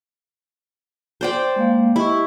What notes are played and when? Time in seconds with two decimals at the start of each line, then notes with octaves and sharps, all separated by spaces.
1.21 C5 D5 G5
1.56 G#3 A#3 F5
1.96 E4 G4 D#5 C#6